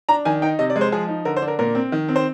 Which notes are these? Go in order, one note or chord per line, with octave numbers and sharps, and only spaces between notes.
D4 A#5
D#3 G#5
D#4 G5
C3 D#5
D5
G#3
C5
F3 G#4
D#4
D3 A#4
C5
D4
A#4
A#2 A#4
C4
D#3
C4
C5